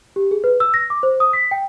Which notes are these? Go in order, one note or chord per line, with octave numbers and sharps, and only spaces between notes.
G4
G#4
B4
E6
A#6
D6
C5
D#6
B6
G5